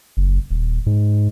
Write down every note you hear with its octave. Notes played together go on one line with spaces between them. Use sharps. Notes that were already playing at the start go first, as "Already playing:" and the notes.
F#1
D#1
G#2